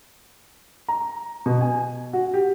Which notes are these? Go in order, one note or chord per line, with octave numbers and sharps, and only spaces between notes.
A#5
B2
G#5
F#4
G4